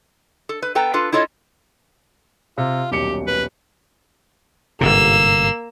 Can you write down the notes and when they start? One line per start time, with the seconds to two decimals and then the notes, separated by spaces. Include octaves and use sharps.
0.49 A4
0.62 B4
0.75 B3 A4 B4 G5 A#5
0.94 D4 F4 A4 B4
1.12 E4 F4 A4 C#5 D#5
2.58 C3 F4
2.92 D#1 B1 G4 C#7
3.27 B4
4.81 G1 G#2 C3 A#3 E6